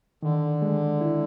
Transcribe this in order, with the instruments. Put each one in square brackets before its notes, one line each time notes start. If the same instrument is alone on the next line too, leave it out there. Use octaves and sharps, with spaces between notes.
[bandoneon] D3 [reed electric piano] D#3
[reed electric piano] G#3
E4